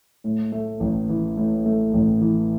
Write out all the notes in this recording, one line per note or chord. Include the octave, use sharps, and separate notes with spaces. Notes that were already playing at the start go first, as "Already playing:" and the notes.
A2
A3
A1
E3
A2
A3
A1
E3